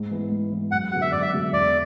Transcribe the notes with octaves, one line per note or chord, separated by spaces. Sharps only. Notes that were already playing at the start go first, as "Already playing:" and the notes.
Already playing: G#2
E3 B3
G#2
E3 B3
F#2 F#5
D3 G#3 B3 F#4 F#5
E5
F#2 D5
E5
D3 G#3 B3 F#4
E2 D5